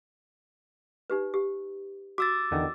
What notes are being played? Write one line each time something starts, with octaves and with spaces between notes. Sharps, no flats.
D#4 G4 B4
G4
F#4 D6 E6 A6
E2 D3 D#3